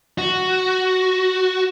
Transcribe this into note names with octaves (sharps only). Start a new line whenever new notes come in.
F#4